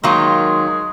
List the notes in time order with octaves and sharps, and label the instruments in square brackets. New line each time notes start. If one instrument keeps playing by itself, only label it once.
[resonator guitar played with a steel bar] D#3 F#3 A#3 F4 [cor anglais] G#3